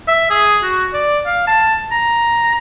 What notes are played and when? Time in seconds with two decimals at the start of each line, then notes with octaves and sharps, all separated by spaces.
0.08 E5
0.30 G#4
0.63 F#4
0.94 D5
1.26 F5
1.48 A5
1.91 A#5